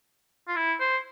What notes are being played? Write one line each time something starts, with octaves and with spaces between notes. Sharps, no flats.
F4
E4
C5